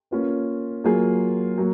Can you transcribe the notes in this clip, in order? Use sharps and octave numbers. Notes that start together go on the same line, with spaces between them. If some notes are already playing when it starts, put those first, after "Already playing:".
A#3 C#4 F4 B4
F#3 A#3 F4 G#4
F#3 A#3